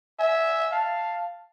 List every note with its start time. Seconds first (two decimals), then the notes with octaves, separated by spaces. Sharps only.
0.19 E5 G#5
0.72 F5 A5